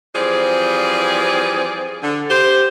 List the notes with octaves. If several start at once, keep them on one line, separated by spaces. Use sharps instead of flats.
E3 F3 G3 C4 G#4 D5
D3
G4 C5